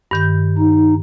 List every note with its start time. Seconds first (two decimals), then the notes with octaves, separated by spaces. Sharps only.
0.11 G2 D#3 G6
0.58 D#4